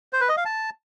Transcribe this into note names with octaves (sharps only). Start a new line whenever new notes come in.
C5
B4
D#5
F5
A5